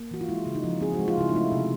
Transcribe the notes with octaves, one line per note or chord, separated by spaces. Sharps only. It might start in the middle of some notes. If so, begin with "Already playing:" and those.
Already playing: A#3
E3 F#4
F4
G#3 E4
C#3
D#4
F3
C4 G#4
G#3 F#4
F4
C#3 E4
D#4
A3 E4
C3